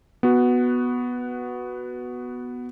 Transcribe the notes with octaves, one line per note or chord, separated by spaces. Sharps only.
B3 F#4